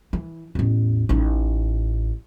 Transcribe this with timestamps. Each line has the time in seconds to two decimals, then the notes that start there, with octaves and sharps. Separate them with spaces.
0.13 E3
0.55 A1 E2
1.09 A1 D#4